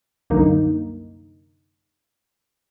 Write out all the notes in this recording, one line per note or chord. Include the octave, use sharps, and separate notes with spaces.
C2 F#2 D3 A#3 D#4